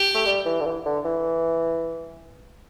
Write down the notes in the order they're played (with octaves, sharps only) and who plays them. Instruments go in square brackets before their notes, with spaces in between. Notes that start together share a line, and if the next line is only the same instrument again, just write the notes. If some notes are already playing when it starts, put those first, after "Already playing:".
Already playing: [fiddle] G4
[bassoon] A3
G3
E3
D3
E3
D3
E3